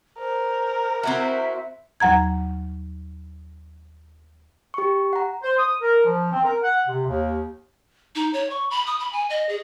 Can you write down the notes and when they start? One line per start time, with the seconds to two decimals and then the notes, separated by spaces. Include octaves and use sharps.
0.18 A#4 C5
1.03 C4 E4 F#4 E5
2.00 D#2 F#3 F#5 A#5 G#6
4.74 G4 C#6
5.13 F#5 A#5
5.43 C5
5.58 D#6
5.81 A#4
6.05 F3
6.32 C4
6.44 A#4
6.63 F#5
6.87 C3
7.07 D#2
8.15 D#4
8.34 C#5
8.50 C#6
8.71 B5
8.86 D#6
8.99 B5
9.13 G#5
9.30 D#5
9.49 G#4